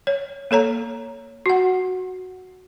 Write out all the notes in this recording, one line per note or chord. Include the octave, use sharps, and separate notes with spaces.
C#5
A#3 A4 C#5 A#5
F#4 F#5